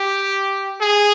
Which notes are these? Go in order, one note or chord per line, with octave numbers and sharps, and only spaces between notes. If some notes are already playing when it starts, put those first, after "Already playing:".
Already playing: G4
G#4